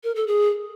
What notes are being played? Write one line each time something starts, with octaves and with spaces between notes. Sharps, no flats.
A#4
A4
G#4